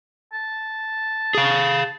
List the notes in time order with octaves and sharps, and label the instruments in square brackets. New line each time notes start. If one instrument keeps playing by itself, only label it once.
[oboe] A5
[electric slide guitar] G#4 F5